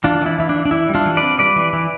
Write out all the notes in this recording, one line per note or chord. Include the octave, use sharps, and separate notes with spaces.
E3 D4 F4
E3 E4
E3 E4
D4
E3
D4
E3 E4
G3
D4 F4
E3
C4 B4 D5
G3 B4 D5
E3
E3